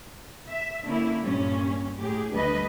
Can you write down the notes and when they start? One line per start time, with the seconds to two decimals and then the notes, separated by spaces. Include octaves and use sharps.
0.51 E5
0.85 D3 A#3 C#4 E4
1.22 G2 A#2 C#4
1.99 A2 G4 G#4
2.34 D2 G3 D4 B4 D#5